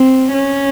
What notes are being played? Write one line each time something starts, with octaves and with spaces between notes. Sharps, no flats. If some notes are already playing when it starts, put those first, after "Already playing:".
Already playing: C4
C#4